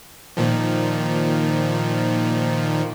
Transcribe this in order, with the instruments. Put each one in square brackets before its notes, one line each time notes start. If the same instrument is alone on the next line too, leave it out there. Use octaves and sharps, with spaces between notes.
[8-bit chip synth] A#2 D#3 F3